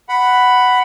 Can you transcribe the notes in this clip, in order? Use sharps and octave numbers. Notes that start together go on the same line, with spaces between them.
F#5 B5